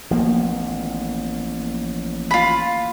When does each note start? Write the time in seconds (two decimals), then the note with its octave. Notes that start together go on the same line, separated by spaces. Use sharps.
0.11 A1 D#3 F3 A#3 B3
2.31 F4 B5